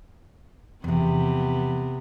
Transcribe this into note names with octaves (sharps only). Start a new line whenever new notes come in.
E2 C3 F3 B3